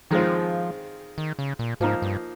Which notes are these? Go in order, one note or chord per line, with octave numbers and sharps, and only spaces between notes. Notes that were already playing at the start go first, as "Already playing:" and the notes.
D#3 F3 G#3 C4 F4
D#3
C#3
A#2
G#2 F3 A#3 D#4
G2